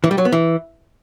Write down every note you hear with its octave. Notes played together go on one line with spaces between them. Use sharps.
E3
G3
F#3
B3
E3